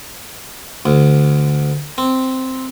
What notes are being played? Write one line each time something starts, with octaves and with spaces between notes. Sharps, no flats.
D2
C4